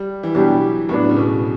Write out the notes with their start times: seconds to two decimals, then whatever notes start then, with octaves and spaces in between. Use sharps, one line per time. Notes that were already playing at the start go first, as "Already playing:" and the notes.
Already playing: G3
0.23 E3
0.35 B2 F#3 G3 D4 G4
0.89 A2 F#3 B3 D4
1.09 C#3
1.16 B2